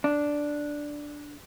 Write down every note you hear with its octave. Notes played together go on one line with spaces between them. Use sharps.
D4